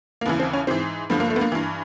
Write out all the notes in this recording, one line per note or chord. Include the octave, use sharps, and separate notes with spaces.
A#3
D#2 C#3 E3 B3
C4
C#4
G#2 E3 C4
G2 D3 F3 B3
A#3
A3
B3
A#3
G2 E3